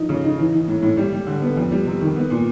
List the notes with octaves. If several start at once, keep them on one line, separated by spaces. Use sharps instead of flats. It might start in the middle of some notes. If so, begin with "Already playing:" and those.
Already playing: F3 D#4
C#3
D#4
E3
E3
A2
A2
G3
G3
D3
B3
F2
G3
C3
D#3
B3
A#2